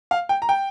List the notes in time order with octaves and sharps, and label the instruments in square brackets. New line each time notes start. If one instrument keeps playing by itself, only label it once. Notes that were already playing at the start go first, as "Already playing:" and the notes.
[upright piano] F5
G5
A#5
G5